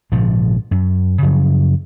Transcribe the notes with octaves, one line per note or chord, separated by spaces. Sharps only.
A#1 G#2 C#3 F3
F#2
F#2 C#3 F3 F#3